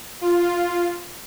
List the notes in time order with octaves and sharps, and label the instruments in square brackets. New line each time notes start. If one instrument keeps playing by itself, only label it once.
[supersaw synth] F4